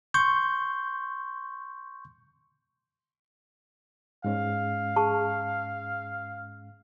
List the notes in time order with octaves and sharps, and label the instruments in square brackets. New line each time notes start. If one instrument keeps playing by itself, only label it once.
[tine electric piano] C6 C#6 G6
[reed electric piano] G#2 G#3 C#4 [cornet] F5
[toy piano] G#4 A5 C#6